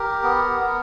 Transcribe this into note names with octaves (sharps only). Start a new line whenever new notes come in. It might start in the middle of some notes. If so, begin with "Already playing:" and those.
Already playing: G4 A#4
B3
B3